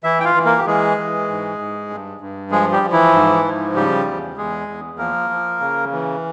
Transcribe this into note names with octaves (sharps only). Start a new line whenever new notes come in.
E3 E4 E5
G5
F4 F5
E3
A#3 A#4
G4
E3 G#3 G#4
E3
G#2
G#2
G2
G2
F3 G#3 G#4
G3 G4
F3
E3 E4
G#2
F3
C#3 G3 G4
E2
E2 G#3 G#4
E2
F3 A#3 A#4
F3
C#3
E3